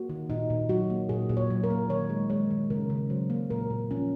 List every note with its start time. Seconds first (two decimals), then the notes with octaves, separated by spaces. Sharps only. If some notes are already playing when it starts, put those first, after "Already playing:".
Already playing: A#3 F#4
0.09 D#3
0.30 A#2 D#4
0.50 A#2
0.69 F#3 F#4
0.90 A#3
1.09 A#2 G#4
1.29 A#2
1.37 C#5
1.50 F#3
1.64 A#4
1.70 A#3
1.89 D#3 C#5
2.09 G#3
2.30 G#3 C#5
2.50 D#3
2.70 C#3 A#4
2.90 C#3
3.10 F#3 C5
3.30 A#3
3.50 A#2 A#4
3.70 A#2
3.91 F3 C#4